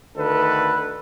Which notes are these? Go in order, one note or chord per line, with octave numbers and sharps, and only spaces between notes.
D2 D#3 A4 B4